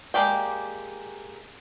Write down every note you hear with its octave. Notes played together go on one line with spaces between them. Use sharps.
G#3 A#3 G4 D5 G5